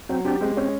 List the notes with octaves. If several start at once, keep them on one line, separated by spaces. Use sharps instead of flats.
F#3 C4
C4 D4 G4
G#3 C4
C4 C#4